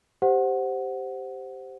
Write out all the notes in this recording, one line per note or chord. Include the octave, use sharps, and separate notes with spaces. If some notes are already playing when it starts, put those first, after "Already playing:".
G4 C5 F#5